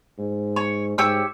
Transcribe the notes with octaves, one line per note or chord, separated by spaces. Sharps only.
G#2
C#5
G#2 G4 C#5 E6